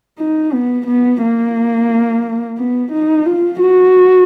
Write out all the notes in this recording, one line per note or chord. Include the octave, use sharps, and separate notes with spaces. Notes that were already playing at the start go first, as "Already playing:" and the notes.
D#4
B3
B3
A#3
B3
D#4
F4
F#4